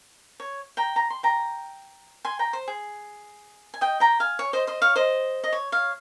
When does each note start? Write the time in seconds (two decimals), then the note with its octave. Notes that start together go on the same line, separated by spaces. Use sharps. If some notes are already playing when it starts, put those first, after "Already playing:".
0.40 C#5
0.77 G5 A#5
0.96 A#5
1.10 C6
1.23 G5 A#5
2.25 G#5 C6
2.39 G5 A#5
2.53 C5
2.68 G#4
3.74 G#5
3.81 D#5 G5
4.00 G5 A#5
4.20 F5 G#5
4.39 C#5
4.53 C5 D#5
4.67 C5 D#5
4.82 C#5 F5
4.96 C5 D#5
5.44 D#5
5.53 C#5
5.72 C#5 F5